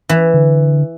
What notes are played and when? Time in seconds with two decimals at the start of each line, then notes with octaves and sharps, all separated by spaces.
0.09 E3
0.34 D3